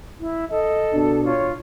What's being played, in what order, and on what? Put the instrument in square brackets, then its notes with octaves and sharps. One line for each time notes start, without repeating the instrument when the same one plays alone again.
[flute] E4
[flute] A4 [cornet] D#5
[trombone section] B2 D4
[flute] F4 [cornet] C#5